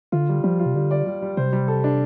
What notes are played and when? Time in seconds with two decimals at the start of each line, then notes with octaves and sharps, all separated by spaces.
0.12 D3 F4
0.29 G3
0.43 F3 G3
0.59 F4
0.66 C3
0.75 D3 G3
0.91 D5
1.06 G3
1.22 G3
1.37 C3 C5
1.53 G3
1.68 A4
1.84 D4